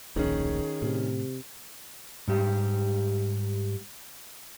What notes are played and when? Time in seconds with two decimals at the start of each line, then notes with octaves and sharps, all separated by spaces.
0.16 D1 A#1 D#3 C#4 G#4
0.82 A2 C3
2.28 G#2 G3 G4